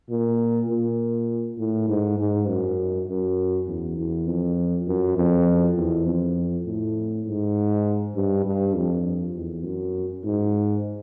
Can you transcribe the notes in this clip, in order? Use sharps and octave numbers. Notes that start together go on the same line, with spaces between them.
A#2
A#2
A2
G#2
G#2
F#2
F#2
E2
E2
F2
F#2
F2
E2
F2
A2
G#2
G2
G2
F2
E2
F#2
G#2